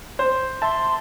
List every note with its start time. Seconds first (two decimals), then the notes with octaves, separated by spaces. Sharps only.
0.19 C5
0.62 E5 A5 C6